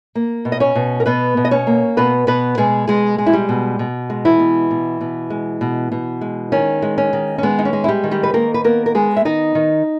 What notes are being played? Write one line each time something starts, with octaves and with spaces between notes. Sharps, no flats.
A#3
B2
D#5
C#4 C#5
B2
A#4
B2 B3 B4
B2
D#5
C#4 C#5
A#3
B2 B3 B4
B2 B3 B4
B2 G#3 G#4
B2 G#3 G#4
G#3
E4
G3 G4
B2
B2
G#3
E3 E4
B2
B2
B2
G#3
B2
B2
G#3
D#3 C#4
G#3
C#4
D#3
C#4
G#3 B3
D#4
C#4
G#3
E4
G3 G4
D#3
G3 G4
B4
D#3 A#3 A#4
B4
A#3 B3 A#4
A#4
G#3 B3 G#4
E5
D#3 D#4 D#5
D#3